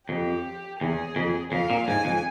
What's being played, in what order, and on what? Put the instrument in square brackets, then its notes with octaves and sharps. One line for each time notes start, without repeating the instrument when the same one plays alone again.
[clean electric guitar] F2 [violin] G4
[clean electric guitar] E2 [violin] G#4
[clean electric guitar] F2
[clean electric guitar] F2 [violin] F5
[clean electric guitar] A#2
[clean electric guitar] G#2 [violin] G#5
[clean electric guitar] F2